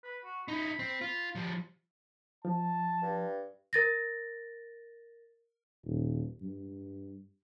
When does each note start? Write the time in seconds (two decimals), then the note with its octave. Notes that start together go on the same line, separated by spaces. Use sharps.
0.04 B4
0.25 F#4
0.48 D#4 E4 B5
0.79 C4
1.01 F4
1.35 F3 G3
2.45 F3 A5
3.03 G2
3.73 A#4 A6 A#6
5.84 D#1
6.42 G2